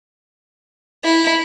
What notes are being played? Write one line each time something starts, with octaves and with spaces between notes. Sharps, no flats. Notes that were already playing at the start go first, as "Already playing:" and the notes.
E4